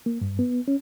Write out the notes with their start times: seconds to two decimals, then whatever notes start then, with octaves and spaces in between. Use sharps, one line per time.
0.06 A#3
0.21 G2
0.39 B3
0.68 C#4